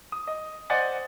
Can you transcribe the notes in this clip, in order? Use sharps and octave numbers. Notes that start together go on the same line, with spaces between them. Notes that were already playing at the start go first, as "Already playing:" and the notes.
D#6
D#5
C5 D5 D#5 F#5 G#5 A6